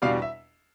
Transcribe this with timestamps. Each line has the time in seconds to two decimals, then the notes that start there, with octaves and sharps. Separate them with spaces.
0.02 E2 B2 G3 D4 F5
0.22 E5